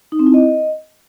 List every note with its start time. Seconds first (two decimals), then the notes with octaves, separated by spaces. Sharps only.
0.12 D#4
0.19 C4
0.27 E4
0.34 D#5